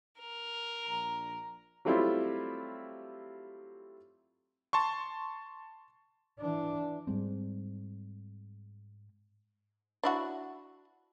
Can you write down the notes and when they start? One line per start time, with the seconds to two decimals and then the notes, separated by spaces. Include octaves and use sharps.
0.20 A#4
0.86 A#1 D4 A#5
1.85 F#3 G3 A3 C4 E4 F4
4.73 A5 C6 C#6
6.39 E3 D4
7.07 G#2 G3 G#3 C4
10.04 D4 E4 F#4